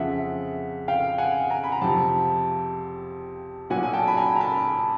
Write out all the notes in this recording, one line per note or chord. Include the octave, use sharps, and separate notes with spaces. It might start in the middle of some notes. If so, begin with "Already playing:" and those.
Already playing: F2 C#3 F3 E5 F#5
F5 G5
F#5 G#5
G#5 A#5
B5
A#5
F2 C3 F3 G5 A5
B1 A#2 F#3 F#5 G#5
G#5
G5 A5
B5
G#5 A#5
A#5
A5 B5